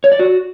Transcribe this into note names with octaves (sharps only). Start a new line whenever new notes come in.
C#5
D5
F#4